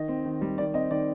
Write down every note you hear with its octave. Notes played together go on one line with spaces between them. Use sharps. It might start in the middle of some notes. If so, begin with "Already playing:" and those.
Already playing: D#3 D#5
C4
D#3
G3
D#3 D5
C4 D#5
D#3 D5